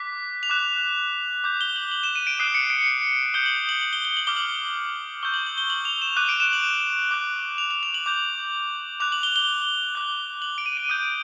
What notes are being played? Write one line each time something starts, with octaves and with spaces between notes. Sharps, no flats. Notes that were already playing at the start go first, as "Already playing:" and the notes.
Already playing: D6 F#6 B6
F7
D6 F#6 E7
D6 G6
G7
F#7
F#7
E7
D#7
D7
D#6 F#6 C7
C#7
D7
D#6 G6 G7
F#7
F#7
F#7
G7
G7
F#7
D6 F6 G7
F#7
C#6 E6 G6 G7
F#7
F#7
G7
F#7
F7
E7
D6 F#6 D#7
D7
E7
F#7
D6 F#6
F7
F7
F7
F#7
D6 G6
D6 F#6 F7
F#7
G7
G7
D6 F#6
F#7
D7
D#7
D#7
D#6 G6 D7